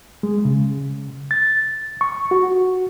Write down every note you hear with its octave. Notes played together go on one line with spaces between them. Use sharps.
G#3
C#3
A6
C#6
F#4